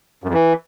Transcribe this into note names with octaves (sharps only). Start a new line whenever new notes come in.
F#2
F2
E3